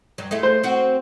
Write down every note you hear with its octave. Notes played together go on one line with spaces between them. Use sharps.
G2 F#3
G#3 A3 E4
C5
C4 F#4